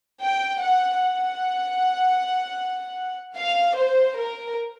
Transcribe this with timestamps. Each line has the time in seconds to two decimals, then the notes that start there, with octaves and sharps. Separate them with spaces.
0.22 G5
0.62 F#5
1.01 F#5
3.37 F5
3.77 C5
4.17 A#4